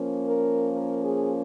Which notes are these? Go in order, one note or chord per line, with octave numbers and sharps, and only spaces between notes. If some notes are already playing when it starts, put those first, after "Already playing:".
Already playing: F3 A#3 C#4
A#4
A#4
G#4